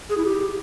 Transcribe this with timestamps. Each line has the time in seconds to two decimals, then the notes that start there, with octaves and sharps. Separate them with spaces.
0.09 G#4
0.17 E4
0.25 G4